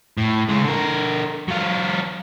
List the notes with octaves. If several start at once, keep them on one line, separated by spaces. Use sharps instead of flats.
A2
C#3 G#3
D3 A#4
F#3 F4